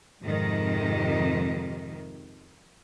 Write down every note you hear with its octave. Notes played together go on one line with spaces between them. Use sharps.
F2 G#2 C3 D#3